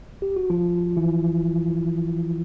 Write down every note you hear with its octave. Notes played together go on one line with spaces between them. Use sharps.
G4
F#4
F3 F4
E3 E4